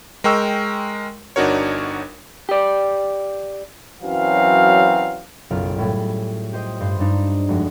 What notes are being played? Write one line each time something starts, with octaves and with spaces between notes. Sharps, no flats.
G#3 A#4 G5 C#6 E6
G1 D4 D#4 F#4 A#4 C#5
G4 D5
F#2 E3 F#3 C4 F5
F#1 B1 F4 F6 D7
A2 G3 G#4
G4 C5 D#5
G2 C5
G2 D4 D#4
F1 G#3 F#4